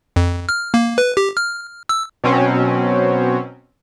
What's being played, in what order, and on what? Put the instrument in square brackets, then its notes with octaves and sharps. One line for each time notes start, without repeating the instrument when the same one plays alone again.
[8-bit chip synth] F2
F6
A#3
B4
G4
F6
E6
[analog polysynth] B2 F#3 C4 C#4